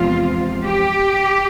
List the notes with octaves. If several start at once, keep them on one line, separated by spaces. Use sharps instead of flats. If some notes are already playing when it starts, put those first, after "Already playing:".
Already playing: E2 C3 F3 G#3 C4 F4
G4